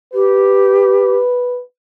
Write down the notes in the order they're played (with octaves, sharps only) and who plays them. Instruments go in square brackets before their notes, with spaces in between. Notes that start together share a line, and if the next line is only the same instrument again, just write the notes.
[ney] G4 [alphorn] B4